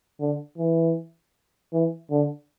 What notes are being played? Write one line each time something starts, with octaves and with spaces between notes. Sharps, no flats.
D3
E3
E3
D3